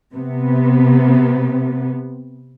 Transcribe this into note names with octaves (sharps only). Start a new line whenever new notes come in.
C3 B3